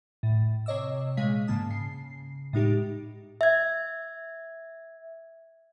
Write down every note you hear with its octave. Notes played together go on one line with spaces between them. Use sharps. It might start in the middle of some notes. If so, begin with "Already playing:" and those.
A2
C3 C#5 D#5 D6 E6
A#2 G#3 G#4 C#5 F5 B6
G#2 C#3 A#3 A5 D#6
C#3 C7
A2 G#3 D#4 G4
E5 G#6